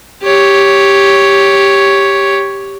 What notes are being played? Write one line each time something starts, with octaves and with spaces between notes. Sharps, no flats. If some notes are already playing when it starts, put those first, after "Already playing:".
G4 C#5